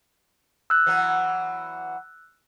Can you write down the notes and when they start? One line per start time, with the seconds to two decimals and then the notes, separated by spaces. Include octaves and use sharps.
0.70 E6 F#6
0.86 E3 F#3 B3